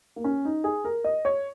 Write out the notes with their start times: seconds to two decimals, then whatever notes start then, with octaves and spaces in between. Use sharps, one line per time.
0.16 A#3
0.24 C#4
0.45 D#4
0.64 G#4
0.84 A#4
1.04 D#5
1.25 C#5